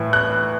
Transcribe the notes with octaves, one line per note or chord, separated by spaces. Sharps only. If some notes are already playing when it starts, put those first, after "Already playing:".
Already playing: A2 E3
F#6